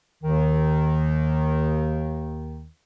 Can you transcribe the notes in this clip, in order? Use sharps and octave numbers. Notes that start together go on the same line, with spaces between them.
D#2 D#3